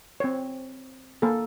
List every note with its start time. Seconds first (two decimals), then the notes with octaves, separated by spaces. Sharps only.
0.20 C4 C#5
1.22 A#3 A4